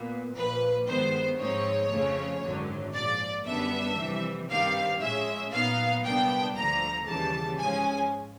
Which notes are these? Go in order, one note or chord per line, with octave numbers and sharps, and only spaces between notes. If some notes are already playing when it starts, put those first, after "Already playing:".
Already playing: A#2 B3
A#1 A#2 F3 B4
G2 D#3 G#3 B3 C5
G#2 F3 G#3 C4 D#4 C#5
F2 C#3 F3 A3 C#4
G#1 F#2 D3 F#3
A#1 G#2 F3 D5
F#2 D3 G3 B3 D4 E5
F2 C3 E3 G3
G2 D#3 G3 C4 F5
A2 F3 G#3 C#4 E5
A#2 F#3 B3 D#4 F5
C2 A#2 G3 B3 D4 G5
D2 D3 F3 A3 A#5
D#2 C#3 E3 G3 A5
G#2 F3 G#3 C#4 G#5